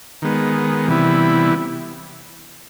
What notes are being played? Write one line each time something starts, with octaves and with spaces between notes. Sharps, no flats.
D#3 G#3 B3
C3 E3 G3 B3 E4